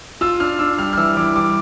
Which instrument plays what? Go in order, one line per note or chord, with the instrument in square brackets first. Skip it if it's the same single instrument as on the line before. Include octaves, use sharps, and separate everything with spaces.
[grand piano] F4 E6
D4 F6
D4 E6
G3 F6
F6
E3 E6
E3 D6
G3 D6